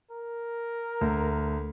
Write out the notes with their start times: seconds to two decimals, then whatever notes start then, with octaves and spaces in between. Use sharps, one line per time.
0.11 A#4
1.01 D2